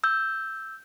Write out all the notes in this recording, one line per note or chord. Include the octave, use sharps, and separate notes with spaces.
E6 G6